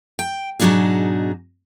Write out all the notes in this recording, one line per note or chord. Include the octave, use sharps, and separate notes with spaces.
G5
G#2 B2 F#3 D4 D#4 G#4